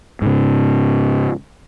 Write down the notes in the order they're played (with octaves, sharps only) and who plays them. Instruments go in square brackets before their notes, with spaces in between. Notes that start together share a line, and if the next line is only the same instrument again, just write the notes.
[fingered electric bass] G#2 C#3